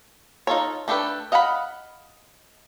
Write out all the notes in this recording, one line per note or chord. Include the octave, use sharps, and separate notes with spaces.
D#4 F4 A4 C#5
A3 D4 G4 A4 B4
D#5 F5 F#5 G#5 B5